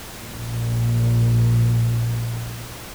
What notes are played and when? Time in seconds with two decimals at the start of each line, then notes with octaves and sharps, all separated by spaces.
0.15 A#1 A#2